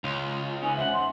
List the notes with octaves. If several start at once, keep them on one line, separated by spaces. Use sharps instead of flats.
C#2 F4
C#4 D#4 B4 G#5
E2 C5 E5 F#5
C6